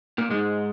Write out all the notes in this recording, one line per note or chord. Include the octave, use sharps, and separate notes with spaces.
A#2 A#3
G#2 G#3